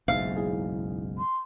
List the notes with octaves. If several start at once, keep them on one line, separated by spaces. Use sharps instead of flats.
F#1 B1 G#2 E5 F5
E4 G#4
C6